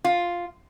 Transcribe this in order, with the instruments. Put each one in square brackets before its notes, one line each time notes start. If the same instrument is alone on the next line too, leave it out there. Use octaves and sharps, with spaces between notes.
[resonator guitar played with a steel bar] F4